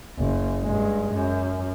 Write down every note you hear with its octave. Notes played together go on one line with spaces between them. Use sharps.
F#1
G2 G#3
F#2